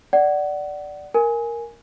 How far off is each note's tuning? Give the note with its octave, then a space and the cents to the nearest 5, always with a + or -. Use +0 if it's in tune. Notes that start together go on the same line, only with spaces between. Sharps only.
D5 +0 F#5 +20
A#4 +0 G#5 +0